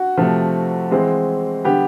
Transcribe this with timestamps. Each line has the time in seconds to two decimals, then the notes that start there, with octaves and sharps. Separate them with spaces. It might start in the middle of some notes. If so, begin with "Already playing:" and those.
Already playing: F#4
0.17 C3 F3 A3
0.91 E3 G#3 C4
1.64 D3 G3 B3 G4